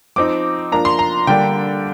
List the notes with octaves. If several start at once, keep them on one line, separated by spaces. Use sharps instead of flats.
F3 C4 D#4 D6
F3 A#3 D4 A#5
C6
A#5
D3 G3 A#3 D4 G5